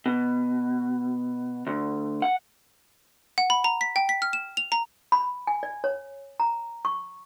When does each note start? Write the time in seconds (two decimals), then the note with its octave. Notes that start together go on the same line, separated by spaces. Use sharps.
0.06 B2
1.67 D2
2.22 F#5
3.38 F#5
3.50 B5
3.64 A#5
3.81 B6
3.96 G5
4.09 B6
4.22 F6
4.33 E7
4.57 F7
4.72 A#5
5.12 B5
5.47 G#5
5.63 D5
5.84 C#5
6.40 A#5
6.85 C#6